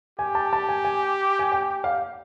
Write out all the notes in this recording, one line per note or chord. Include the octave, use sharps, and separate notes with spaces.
G4 G#5
A5
A5
G#5
G#5
G#5
G5
F5